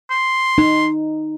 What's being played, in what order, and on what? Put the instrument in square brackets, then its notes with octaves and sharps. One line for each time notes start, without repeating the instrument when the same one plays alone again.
[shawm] C6
[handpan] D#4